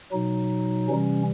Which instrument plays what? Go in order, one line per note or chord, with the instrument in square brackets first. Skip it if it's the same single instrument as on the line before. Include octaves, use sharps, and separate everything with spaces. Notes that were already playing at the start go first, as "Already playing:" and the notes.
[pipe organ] B2 F#3 D#4
C3 E3 G3 C#4